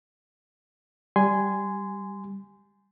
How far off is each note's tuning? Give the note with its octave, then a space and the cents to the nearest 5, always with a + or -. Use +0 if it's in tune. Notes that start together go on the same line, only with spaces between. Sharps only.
G3 +0 G#5 +0 C6 -20